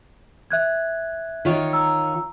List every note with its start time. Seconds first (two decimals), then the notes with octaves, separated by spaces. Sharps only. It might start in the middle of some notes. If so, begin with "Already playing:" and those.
0.51 E5 F#6 G#6
1.45 D#3 F4 C#5
1.73 A#5 E6